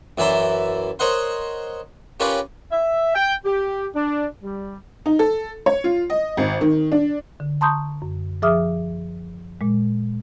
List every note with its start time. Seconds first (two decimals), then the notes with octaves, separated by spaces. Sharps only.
0.18 F#2 E3 D5 E5 A#5 C6
0.99 A#4 C5 C#5 D#5 F#5 C6
2.20 C#4 F4 G4 A#4 B4 D5
2.72 E5
3.15 G5
3.45 G4
3.95 D4
4.43 G3
5.06 D#4
5.19 A4
5.66 C#5
5.84 F4
6.10 D#5
6.37 G#1
6.61 D#3
6.92 D4
7.40 D3
7.61 A5 A#5 C6 C#6 D#6 G6
8.02 F#2
8.42 F3 G#4 E5 D6 D#6 F6
9.61 A#2 G#3